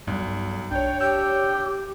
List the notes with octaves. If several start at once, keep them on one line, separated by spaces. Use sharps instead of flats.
B1 G2
B1 D4 C#5 G5
G4 G5 E6